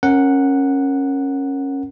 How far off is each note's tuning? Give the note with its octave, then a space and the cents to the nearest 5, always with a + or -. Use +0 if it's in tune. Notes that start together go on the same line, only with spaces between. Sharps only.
C#4 -15 A#4 +0 F#5 +0